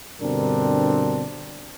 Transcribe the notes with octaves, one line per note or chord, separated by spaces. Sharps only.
G2 B2 D3 C4 D4 A#4